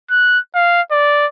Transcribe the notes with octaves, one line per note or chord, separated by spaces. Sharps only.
F#6
F5
D5